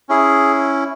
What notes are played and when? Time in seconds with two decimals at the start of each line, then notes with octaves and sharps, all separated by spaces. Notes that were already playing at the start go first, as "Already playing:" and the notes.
0.09 C#4 E4 G#4